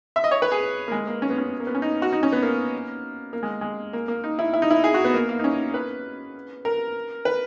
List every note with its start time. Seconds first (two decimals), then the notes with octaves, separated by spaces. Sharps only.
0.16 E5
0.24 D#5
0.31 C#5
0.42 B4
0.52 G#4
0.88 A#3
0.92 G#3
1.07 A#3
1.22 C#4
1.30 B3
1.38 C#4
1.60 A#3
1.67 B3
1.75 C#4
1.82 D#4
2.02 F#4
2.13 D#4
2.23 C#4
2.33 B3
2.43 A#3
3.33 A#3
3.43 G#3
3.61 G#3
3.93 A#3
4.08 A#3
4.24 D#4
4.39 E4
4.53 E4
4.62 D#4
4.71 E4
4.84 G#4
4.94 F#4
5.05 B3
5.14 A#3
5.29 A#3
5.39 D#4
5.44 C#4
5.74 B4
6.65 A#4
7.25 B4